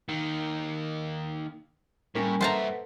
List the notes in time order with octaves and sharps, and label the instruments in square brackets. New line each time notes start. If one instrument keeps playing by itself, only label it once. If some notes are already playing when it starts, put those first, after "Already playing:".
[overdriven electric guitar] D#3 A#3
[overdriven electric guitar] A2 [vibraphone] G3 C#4 G#5 [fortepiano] A#3
[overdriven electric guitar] G2 E5 [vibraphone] A4 B4 F#5 [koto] C5 A5 A#5